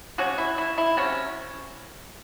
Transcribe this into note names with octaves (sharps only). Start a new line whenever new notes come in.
C3 F#3 C#4 F#4
E4
E4
E4
C3 F#3 C#4